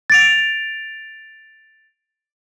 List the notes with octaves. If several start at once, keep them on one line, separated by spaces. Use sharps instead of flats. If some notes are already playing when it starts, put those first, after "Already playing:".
A6 D7 F7